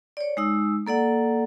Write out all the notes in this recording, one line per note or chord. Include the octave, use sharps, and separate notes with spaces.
C#5 D5
G#3 D#4 E6
A#3 A4 D5 F#5